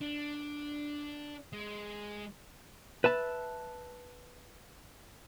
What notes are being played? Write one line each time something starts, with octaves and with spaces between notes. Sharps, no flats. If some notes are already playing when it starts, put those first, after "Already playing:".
D4
G#3
B4 E5 A5